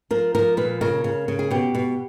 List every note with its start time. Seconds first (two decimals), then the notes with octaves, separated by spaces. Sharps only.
0.11 F3 A#4
0.35 F3 A#4
0.57 A#2 B4
0.81 C#3 A#4
1.04 C#3
1.28 C#3
1.39 G#4
1.51 B2 G4
1.75 B2